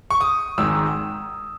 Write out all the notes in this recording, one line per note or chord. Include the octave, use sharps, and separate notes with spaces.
C#6
D#6
G#1 G#2 D#3 E6